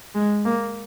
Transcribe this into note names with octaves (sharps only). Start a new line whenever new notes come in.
G#3
A#3